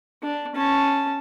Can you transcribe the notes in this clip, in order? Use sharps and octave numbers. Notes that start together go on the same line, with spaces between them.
D4
C#4 A5